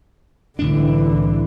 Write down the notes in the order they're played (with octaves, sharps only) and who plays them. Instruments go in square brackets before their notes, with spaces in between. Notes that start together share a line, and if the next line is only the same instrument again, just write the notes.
[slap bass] C2 A2 D4 [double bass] D3 E3